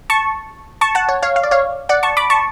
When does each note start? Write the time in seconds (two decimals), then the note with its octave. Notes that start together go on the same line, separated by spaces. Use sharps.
0.10 A5 C#6
0.81 A5 C#6
0.95 F#5 A5
1.09 C#5
1.22 C#5 F5
1.36 F5
1.43 D5
1.51 C#5 F5
1.89 D5 F#5
2.03 A5 C#6
2.17 B5 D6
2.30 A5 C#6